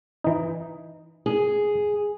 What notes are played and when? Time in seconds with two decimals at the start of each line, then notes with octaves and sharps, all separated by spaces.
0.24 E3 D#4
1.26 G#4